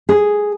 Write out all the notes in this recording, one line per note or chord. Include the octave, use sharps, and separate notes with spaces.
G#4